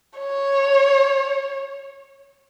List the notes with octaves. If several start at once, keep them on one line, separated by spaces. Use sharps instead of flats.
C#5